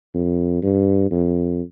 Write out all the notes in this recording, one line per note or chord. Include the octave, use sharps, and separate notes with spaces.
F2
G2
F2